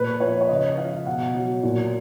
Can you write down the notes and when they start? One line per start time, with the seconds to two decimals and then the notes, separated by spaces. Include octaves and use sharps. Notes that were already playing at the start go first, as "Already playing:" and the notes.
Already playing: A#2 B4
0.20 F3 C#5
0.41 C#5
0.49 C#3 D#5
0.78 F3 F5
1.06 B2 F#5
1.35 F#3
1.63 A#2